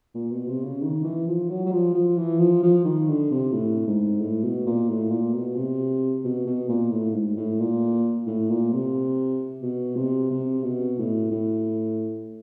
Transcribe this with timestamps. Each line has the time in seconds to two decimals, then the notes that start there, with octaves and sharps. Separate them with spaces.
0.15 A#2
0.31 B2
0.48 C3
0.64 C#3
0.82 D#3
1.04 E3
1.27 F3
1.50 F#3
1.66 F#3
1.72 F3
1.94 F3
2.17 E3
2.39 F3
2.63 F3
2.84 D#3
3.08 D3
3.31 C3
3.52 A2
3.87 G#2
4.21 A2
4.43 B2
4.66 A#2
4.89 A2
5.10 A#2
5.34 B2
5.56 C3
6.24 B2
6.46 B2
6.69 A#2
6.91 A2
7.14 G#2
7.37 A2
7.60 A#2
8.27 A2
8.50 A#2
8.72 C3
9.62 B2
9.96 C3
10.30 C3
10.64 B2
10.99 A2
11.31 A2